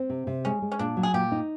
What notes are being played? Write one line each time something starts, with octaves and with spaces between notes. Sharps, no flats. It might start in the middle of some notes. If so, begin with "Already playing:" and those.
Already playing: C4
C3
C3
G#3 C#4
G#3
C#4
A#2 D4
F#3
G#4
A#2 G4
D#4